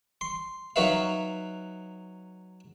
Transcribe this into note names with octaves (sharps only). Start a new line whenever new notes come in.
C6
F#3 D#4 F#4 B4 E5 F5